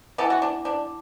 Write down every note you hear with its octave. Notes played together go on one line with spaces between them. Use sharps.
E3 B3 A4
F#4
D4
D4